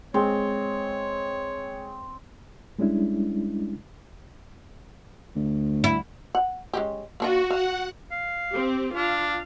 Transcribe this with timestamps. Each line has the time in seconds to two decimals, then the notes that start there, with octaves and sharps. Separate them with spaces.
0.14 G#3 C4 C#5
2.79 G3 G#3 C#4 D4 E4
5.36 D2
5.84 E4
6.35 F#5
6.73 G#3 C#4 G4
7.20 A#3 D4 F4 F#4
7.51 F5 F#5
8.11 F5
8.52 C4 G4
8.95 D4 F4 F5